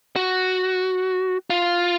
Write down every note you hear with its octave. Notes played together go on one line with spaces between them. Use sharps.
F#4
F4